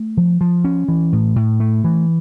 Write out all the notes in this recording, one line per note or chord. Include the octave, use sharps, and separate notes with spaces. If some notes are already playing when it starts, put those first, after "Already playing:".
Already playing: A3
F3
F3
C#4
E3
A2
A2
A3
E3